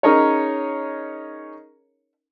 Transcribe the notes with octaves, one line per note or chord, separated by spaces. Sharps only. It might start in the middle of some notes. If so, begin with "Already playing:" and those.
C#4 D#4 G#4 A#4 C#5